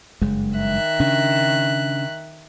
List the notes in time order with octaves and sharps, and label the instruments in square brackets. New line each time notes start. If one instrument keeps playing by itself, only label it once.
[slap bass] F#1 G2 G#3
[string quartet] D#3 E5 F#6
[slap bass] C#3 C#4 D4